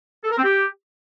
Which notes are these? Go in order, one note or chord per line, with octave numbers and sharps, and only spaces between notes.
A4
A#4
C4
G4